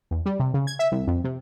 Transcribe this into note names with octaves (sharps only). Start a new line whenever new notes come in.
E2
G3
C3
C#3
G#6
E5
C2
F2
C3